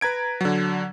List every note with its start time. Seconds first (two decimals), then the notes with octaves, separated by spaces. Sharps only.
0.01 B4 A#5 G#6 D7
0.41 D3 F#3